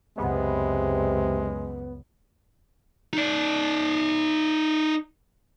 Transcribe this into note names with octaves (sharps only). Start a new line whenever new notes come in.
C#2 F#2 C3 G#3 B3
D#4 D5